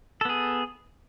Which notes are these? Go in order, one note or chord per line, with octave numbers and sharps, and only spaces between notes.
B3 G#4 A4